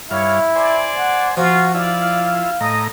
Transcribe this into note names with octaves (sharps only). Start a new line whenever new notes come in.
G2 E4 C#5 F5
C5 D5 G#5
F#5
F3 F4 F#4
E4 F4 D5 F5
A2 D#5 A#5